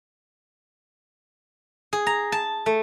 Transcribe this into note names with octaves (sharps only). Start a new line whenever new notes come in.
G#4
A#5
A5
A3